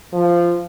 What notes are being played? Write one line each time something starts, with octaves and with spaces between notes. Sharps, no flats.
F3